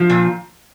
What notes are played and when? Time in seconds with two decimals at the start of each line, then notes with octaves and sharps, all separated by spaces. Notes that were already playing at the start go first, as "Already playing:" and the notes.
Already playing: F3
0.10 A#2